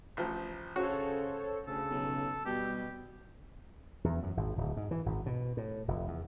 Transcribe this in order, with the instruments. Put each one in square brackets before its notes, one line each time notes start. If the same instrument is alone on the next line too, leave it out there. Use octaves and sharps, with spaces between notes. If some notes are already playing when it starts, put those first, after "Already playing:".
[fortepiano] A1 F3
[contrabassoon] C#3 [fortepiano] F#4 [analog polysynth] A4 C5 C#5
[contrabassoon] D2 [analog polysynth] C#3 [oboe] A4
[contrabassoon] B1
[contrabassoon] B2 [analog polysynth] G3 [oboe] G4
[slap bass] E2
F#2
G#1
D1
G#2
E3
G#1
B2
A2
F1
E2